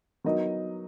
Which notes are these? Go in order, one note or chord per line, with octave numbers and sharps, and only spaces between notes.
F#3 B3 D#4 A#4 D#5